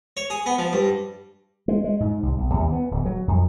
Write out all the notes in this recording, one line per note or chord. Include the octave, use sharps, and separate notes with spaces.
C#5
G#4
B3
F3
G2
G#3
G#3
G#2
C2
B1
D#2
B3
D1
F#3
F2